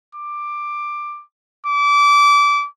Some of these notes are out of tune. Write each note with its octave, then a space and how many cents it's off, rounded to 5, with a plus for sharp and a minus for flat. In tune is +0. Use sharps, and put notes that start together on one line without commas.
D6 +15
D6 -25